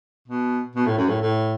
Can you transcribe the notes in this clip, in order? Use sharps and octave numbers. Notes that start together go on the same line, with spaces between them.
B2
B2
A2
F#2
A2
A2